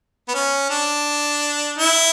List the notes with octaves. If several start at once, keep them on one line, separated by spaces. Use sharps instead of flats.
B3
C#4
D4
E4